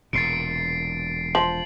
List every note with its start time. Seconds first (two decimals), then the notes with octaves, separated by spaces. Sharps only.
0.13 E1 A#2 A6 C7 D7
1.35 F3 F#7